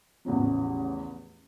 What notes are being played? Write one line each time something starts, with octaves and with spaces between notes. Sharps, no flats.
A1 E2 C#3 F3